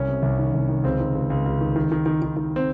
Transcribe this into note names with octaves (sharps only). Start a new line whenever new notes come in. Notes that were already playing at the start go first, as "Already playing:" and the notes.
Already playing: C2 C#4
C3
C2
D#3
C2
D#3
C#2 C4
D#3
C#2
C#2
C#2
D#3
D#3
D#3
D#3
D#3
D#3
C4